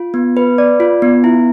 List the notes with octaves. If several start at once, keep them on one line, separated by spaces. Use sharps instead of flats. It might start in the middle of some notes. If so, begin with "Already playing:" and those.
Already playing: F4
B3
B4
D5
F4
B3
E4